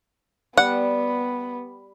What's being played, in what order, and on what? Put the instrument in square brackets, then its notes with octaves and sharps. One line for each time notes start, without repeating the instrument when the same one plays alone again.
[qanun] G3 [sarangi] B3 [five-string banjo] F#5